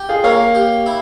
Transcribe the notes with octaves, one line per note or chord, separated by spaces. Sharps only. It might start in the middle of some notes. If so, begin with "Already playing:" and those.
Already playing: G4
F4 G#4
A#3 C#5 F5
G4
E4